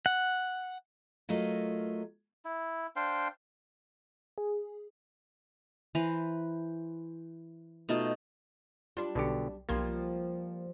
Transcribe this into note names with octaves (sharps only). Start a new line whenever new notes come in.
F#5
F#3 A3 F4 A#4 D#5
E4
D4 C5 F5 G5
G#4
E3 B4 C5 A#5
B2 A3 D#4 F4
G3 D4 F4
B1 B2 D3 G4 C#7
B1 F3 G3 A#3 C6 G#6